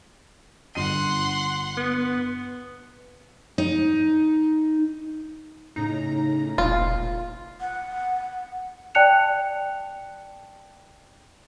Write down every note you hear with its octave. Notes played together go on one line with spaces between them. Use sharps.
G1 F#5 C6 C7 D#7
B3
D#4
A2 C#3 D#4 A#5
E1 A#1 A#2 F4
F#5
D5 G5 A5 F#6 C#7 F7